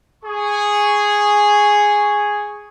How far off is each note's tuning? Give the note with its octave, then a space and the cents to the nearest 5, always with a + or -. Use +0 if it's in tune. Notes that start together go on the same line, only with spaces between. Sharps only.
G#4 -5 C#6 +0